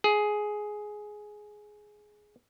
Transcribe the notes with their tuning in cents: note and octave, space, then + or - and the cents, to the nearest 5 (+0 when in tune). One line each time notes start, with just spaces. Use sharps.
G#4 +10